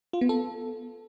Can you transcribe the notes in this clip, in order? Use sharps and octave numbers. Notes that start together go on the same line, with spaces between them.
F4
B3
A4